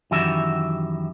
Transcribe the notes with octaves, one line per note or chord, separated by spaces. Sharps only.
F#2 D#3 E3 F#4 G4 E5